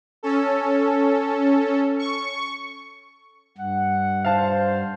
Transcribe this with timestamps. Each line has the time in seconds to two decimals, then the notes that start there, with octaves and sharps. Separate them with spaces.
0.23 C#4 A4
1.99 C#6
3.58 G2 F#5
4.25 C5 F5 A5